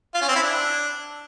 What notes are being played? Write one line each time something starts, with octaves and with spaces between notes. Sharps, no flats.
F4
C#4
C4
E4
D4